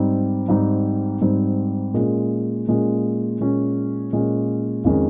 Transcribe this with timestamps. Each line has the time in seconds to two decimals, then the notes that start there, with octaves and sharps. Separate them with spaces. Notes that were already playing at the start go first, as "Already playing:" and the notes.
Already playing: G#2 G3 C4 D#4
0.48 G#2 G3 C4 D#4
1.21 G#2 G3 C4 D#4
1.94 A#2 G#3 C#4
2.68 A#2 G#3 C#4
3.40 A#2 G#3 C#4
4.13 A#2 G#3 C#4
4.84 F2 D#3 G#3 C#4